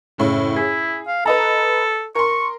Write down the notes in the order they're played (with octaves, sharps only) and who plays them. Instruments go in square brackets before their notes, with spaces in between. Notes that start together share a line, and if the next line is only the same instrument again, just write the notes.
[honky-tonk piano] F#1 A2 C#3
[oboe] E4 [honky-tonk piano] G#4
[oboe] F5
[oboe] A4 [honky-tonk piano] B4 D#5 A#5
[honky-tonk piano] A#4 C6 [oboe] C#6